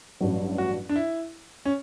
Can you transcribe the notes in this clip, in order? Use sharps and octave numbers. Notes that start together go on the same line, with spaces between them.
A1 G2 F#3
F#4
D4
E4
C#4